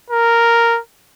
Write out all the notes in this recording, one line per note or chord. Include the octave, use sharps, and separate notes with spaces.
A#4